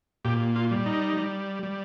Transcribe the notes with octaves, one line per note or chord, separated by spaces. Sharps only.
A#2 G4
F4
G3
D#4
G3
G3